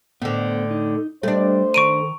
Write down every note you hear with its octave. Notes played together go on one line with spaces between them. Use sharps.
A2 D3 B3 C5
D#4
G3 A3 D4 C5
D#3 A#5 C#6 D7 D#7